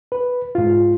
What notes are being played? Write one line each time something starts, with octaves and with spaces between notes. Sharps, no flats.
B4
G#2 F4